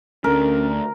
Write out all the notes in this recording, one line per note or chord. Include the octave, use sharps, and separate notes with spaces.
D2 A3 C#4 A#4